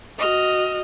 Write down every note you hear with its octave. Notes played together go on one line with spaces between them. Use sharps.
F#4 D#5 F6